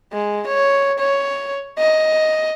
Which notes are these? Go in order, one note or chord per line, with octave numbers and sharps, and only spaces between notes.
G#3
C#5
C#5
D#5